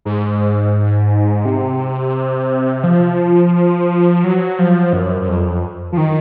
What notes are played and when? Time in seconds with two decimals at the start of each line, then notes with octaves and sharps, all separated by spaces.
0.05 G#2
1.45 C3
2.84 F3
4.24 F#3
4.59 F3
4.93 F#2
5.21 F#2
5.28 F2
5.92 F3
5.97 D#3